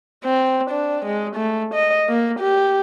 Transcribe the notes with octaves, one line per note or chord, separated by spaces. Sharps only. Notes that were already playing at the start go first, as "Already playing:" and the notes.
C4
D4
G#3
A3
D#5
A#3
G4